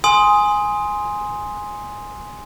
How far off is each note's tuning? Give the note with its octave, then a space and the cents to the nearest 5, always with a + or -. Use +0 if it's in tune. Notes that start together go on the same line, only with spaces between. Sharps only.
G#5 +0 C6 +0 D#6 +10